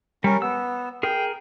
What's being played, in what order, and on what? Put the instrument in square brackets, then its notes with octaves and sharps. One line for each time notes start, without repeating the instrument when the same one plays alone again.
[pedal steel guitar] G3 [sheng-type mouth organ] C#4 A#4
[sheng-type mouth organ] B3 [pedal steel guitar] E6
[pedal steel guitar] G#4 A#4 [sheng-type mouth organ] G5